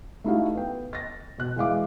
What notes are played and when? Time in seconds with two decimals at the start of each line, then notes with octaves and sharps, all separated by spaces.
0.24 A3 D#4 E4 F#4 G4 F5
0.55 B3 G5
0.93 A6 A#6
1.38 B2 F#6
1.56 E3 G#3 F5 D6